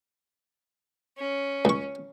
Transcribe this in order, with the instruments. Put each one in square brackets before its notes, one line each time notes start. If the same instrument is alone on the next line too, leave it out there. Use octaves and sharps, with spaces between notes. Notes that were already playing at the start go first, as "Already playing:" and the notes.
[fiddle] C#4
[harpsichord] C#2 C#6